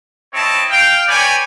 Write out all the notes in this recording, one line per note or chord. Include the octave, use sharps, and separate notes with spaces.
C4 E4 C#5 D#5 A5
F5 G5
B4 C#5 D5 G5 G#5